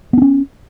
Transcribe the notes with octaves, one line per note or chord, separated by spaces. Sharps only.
B3 C#4 D4